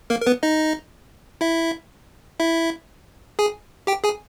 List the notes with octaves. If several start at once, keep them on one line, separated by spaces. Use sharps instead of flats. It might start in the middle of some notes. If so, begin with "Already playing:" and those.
A#3 A#4
A#4
B3 B4
D#4 D#5
E4 E5
E4 E5
G#4 G#5
G4 G5
G#4 G#5